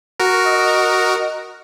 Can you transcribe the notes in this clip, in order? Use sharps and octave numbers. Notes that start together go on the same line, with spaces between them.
F#4 A#4
D#5